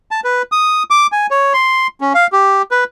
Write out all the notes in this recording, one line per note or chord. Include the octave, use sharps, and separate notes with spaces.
A5
B4
D#6
D6
G#5
C#5
C6
C#4
F5
G4
B4